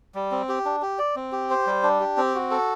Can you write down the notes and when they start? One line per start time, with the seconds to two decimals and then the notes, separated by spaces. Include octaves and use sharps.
0.15 G3
0.31 C4
0.49 G4
0.65 D4
0.82 G4
0.99 D5
1.16 C4
1.32 G4
1.50 C5
1.67 G3
1.83 D4
2.00 G4
2.17 C4
2.35 F#4
2.51 A4